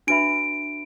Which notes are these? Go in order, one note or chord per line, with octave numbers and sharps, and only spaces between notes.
D4 F#4 B4 E5 B5 D7